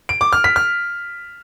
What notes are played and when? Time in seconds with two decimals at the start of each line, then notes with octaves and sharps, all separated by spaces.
0.09 D7
0.21 D6
0.33 F6
0.44 B6
0.56 F6